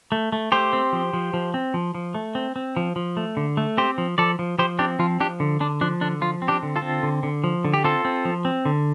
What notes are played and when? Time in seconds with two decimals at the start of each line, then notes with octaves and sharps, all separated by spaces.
0.12 A3
0.32 A3
0.52 A3 G4 C5
0.73 C4
0.93 F3
1.14 F3
1.34 F3
1.54 C4
1.74 F3
1.95 F3
2.15 A3
2.35 C4
2.56 C4
2.77 F3
2.96 F3
3.17 A3
3.37 D3
3.57 A3
3.77 C4 G4 C5
3.98 F3
4.18 F3 A4 D5
4.39 F3
4.59 F3 G4 C5
4.79 C4 D4 G4
4.99 F3 F4
5.20 F3 D4 G4
5.40 D3
5.60 D3 D4
5.81 F3 D4
6.01 D3 D4
6.21 F3 F4
6.42 C4
6.48 D4 G4
6.63 D3
6.76 F4 A4
6.82 C4
7.03 D3
7.23 D3
7.44 F3
7.65 D3
7.74 G4
7.84 C4 F4 A4
8.05 C4
8.25 F3
8.45 C4
8.65 D3